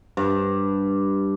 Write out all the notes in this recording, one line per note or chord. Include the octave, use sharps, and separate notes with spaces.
G2